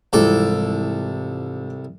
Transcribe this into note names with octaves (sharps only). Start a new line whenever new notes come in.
C2 G#2 E3 F3 A4 D6